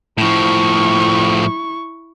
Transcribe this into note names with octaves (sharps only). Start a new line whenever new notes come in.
A2 F3 E4 C#6